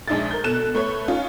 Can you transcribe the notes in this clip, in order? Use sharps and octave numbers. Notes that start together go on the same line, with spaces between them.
A#1 G#3 D4 D#4 E5 A6
A#4 G6
B2 A4 F#6 E7
A3 B4 C#5 C#6
C#4 D#4 F4